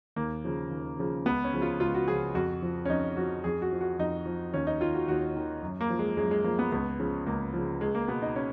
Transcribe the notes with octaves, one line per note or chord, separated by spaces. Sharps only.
D#2 A#3
C#3 F3
D#2
C#3 F3
C#2 B3
C#4
C#3 F3
F4
C#2 F4
F#4
C#3 F3 G#4
F2 F#4
F3
C#4
F2 D#4
F3 F#4
F2 G#4
F#4
F3
F#4
F2 D#4
F3
D#2 C#4
D#4
D#3 F4
F#4
D#2 F#4
D#3
F#2
A#3
F3
G#3
F#2 G#3
G#3
F3 A#3
B3
C#2 B3
C#3 F3
C#2 A#3
C#3 F3
C#2 G#3
A#3
B2 B3
D#4
C#4